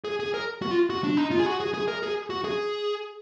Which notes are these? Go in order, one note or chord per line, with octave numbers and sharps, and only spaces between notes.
G#4
G#4
A#4
F#4
F4
F#4
D4
D#4
F4
G#4
F#4
G#4
G#4
A#4
G#4
F#4
G#4